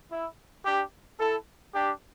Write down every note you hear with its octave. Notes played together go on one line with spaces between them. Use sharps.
E4
D4 G4
E4 A4
D4 G4